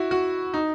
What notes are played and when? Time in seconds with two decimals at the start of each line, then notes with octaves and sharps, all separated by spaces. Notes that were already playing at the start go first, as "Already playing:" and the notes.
Already playing: E4 F#4
0.11 F#4
0.54 D#4